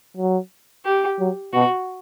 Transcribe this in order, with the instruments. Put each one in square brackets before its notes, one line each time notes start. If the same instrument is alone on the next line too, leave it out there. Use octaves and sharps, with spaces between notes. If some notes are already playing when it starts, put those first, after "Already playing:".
[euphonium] F#3
[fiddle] G4
[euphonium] F#3
[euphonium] B2 [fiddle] F#4